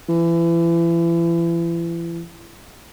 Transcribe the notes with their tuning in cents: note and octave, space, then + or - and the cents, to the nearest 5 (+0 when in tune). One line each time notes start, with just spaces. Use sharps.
E3 +35